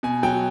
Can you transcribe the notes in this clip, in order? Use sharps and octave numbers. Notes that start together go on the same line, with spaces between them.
B2 G#5
F#3 G5